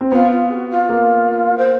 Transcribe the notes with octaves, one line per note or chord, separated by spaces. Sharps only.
C4
B3 F4
F4
G#4
F#4
F4
A#3
C5